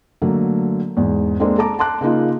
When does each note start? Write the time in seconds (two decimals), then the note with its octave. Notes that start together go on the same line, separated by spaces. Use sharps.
0.22 D3 F#3 A3 A#3
0.97 E2 G#2
1.40 G#3 A#3 C4 D4 A4 C5
1.58 A4 A5 A#5 D6
1.79 A5 C6 D6 F#6
2.01 C#3 A#3 D#4 F4